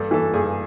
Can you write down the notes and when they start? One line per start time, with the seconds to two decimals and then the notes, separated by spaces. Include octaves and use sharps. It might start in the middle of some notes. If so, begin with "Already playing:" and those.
Already playing: G2 A4
0.11 E3 A4
0.34 G2 G#4